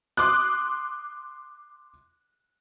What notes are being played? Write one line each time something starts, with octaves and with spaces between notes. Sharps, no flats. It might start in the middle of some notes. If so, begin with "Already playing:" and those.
C6 D6 D#6 F#6